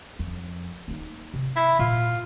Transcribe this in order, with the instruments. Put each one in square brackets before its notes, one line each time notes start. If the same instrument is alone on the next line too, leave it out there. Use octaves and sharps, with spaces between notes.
[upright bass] F2
A#3 D#4
C3
[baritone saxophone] E4
[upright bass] A#2 [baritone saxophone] F4